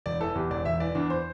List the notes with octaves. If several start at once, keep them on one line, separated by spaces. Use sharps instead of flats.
E1 D5
E3 A4
E2 G4
E1 D5
E1 E5
E3 D5
E2 D4
C5